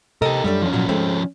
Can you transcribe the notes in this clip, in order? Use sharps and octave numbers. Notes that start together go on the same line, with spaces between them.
C3 G4 A4 A#4 D#5
F#2 G3 A3 D4
F3 C#4
A#2 F#3
G#3 A3 C4